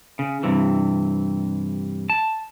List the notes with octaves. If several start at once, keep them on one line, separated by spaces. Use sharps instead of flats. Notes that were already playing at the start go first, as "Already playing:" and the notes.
C#3
G2 C3 E3
A5